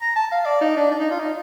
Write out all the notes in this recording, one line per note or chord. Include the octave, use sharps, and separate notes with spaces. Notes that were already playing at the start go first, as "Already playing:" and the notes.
A#5
A5
F5
D5
D#4
D4
D4
D#4
F4
D#4